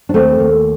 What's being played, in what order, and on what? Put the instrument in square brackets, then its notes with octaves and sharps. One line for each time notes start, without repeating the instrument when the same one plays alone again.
[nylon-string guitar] D4
D#2 A3 C4
D#2